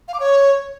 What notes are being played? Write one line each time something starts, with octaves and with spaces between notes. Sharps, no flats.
F5
D6
C#5